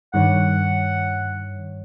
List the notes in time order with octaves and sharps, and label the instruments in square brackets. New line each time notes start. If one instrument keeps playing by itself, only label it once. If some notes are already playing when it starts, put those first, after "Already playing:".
[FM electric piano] G2 D#3 C#5 [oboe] F#5